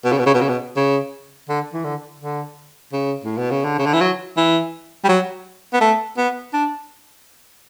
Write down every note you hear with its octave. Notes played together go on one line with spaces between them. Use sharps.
B2
C#3
B2
C#3
B2
C#3
B2
C#3
D3
E3
D3
D3
C#3
A2
B2
C#3
D3
C#3
D3
E3
F#3
E3
G3
F#3
B3
A3
B3
D4